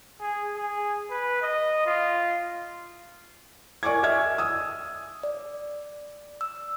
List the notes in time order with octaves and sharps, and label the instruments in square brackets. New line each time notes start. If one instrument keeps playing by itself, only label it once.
[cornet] G#4
G#4
B4
D#5
F4
[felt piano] A#4 D5 G#5 C#6 D6 G#6
D#5 E5 G#5 F6 G#6
D#6 E6
[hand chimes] D5
E6